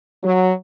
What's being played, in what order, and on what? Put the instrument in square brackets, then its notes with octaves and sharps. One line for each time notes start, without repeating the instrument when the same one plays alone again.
[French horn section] F#3